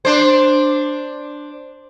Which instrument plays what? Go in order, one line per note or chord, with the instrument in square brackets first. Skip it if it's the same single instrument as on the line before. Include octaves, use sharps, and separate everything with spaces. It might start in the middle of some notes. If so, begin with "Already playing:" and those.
[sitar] D4 C5